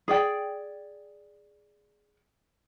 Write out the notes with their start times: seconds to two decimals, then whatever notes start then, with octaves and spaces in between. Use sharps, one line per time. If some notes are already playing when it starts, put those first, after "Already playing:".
0.08 G#4 D5 G5